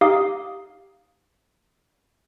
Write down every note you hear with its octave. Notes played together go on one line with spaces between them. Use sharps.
D#4 G4 F5 D6 D#6